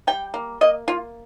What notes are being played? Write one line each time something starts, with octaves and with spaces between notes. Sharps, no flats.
G3 G5
A#3
A#3 D#5
A#3 F4